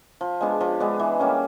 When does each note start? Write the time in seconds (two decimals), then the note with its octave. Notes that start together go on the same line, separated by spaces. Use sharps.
0.21 F3
0.41 G#3 B3 D4
0.61 F3
0.80 G#3 B3 D4
0.99 E3
1.19 G3 A#3 C#4